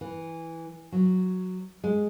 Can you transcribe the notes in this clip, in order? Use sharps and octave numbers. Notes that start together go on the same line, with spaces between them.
E3
F#3
G#3